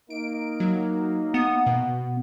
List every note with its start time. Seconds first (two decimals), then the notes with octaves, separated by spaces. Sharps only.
0.10 A#3 D#4 D7
0.60 F#3
1.34 B3 D#6
1.66 B2